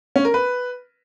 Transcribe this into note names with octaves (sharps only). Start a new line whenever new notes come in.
C#4
A#4
B4